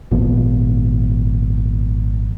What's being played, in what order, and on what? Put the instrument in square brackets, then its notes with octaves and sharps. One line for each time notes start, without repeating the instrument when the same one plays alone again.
[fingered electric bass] G#1 A#2 F3 B3